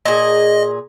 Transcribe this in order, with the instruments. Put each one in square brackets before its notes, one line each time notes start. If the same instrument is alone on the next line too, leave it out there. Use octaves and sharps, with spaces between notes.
[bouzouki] A#2 G#4 [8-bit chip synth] D#5